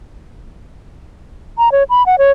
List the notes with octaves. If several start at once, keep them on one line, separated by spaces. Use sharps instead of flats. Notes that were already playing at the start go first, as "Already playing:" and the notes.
A#5
C#5
B5
F#5
C#5